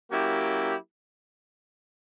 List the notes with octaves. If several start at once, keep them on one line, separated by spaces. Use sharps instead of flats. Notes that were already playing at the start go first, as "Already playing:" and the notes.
F#3 A#3 C#4 E4 G4